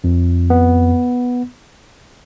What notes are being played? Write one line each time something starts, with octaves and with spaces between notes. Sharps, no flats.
F2
B3